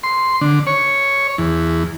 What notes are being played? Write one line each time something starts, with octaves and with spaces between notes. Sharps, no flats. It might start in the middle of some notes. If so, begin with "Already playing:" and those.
C6
D3
C#5
E2